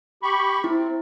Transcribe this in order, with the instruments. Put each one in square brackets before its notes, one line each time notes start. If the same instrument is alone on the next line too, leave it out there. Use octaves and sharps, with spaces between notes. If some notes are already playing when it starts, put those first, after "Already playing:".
[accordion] G4 B5 C#6
[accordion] C4 [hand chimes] E4